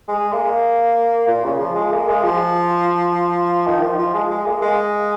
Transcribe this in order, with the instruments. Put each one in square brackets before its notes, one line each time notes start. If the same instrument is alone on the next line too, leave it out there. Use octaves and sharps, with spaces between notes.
[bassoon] G#3
A#3
A#2
C#3
F3
G#3
A#3
G#3
F3
D#3
F3
F3
G#3
G#3
A#3
G#3